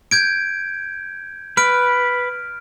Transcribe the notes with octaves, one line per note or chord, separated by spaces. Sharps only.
G6 G#6 D7
B4 F6 D7